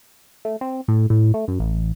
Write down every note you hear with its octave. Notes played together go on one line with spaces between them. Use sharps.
A3
C4
A2
A2
A3
F#2
A1